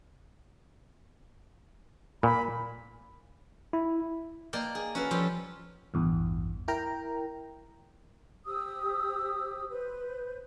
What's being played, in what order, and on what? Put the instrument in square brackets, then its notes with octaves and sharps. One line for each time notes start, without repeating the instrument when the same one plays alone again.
[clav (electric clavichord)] A#2 [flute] B5
[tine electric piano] E4
[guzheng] A#3 A#4 D5 D#5 G5 A5
G#4
C#4 F#4 A4 B4 F5
F3 G3 A4 C#5
[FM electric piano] A1 E2 G2
E4 A#4 G5 A#5
[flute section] G4 C5 D#6 E6
B4 C5